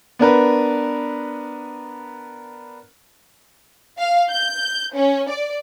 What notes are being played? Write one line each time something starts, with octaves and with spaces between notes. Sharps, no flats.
B3 D4 A#4 B4
F5
G6
C#4
D5